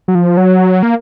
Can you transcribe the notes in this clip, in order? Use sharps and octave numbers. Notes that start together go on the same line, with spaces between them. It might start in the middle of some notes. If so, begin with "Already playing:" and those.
F#3
F3
F#3
A#3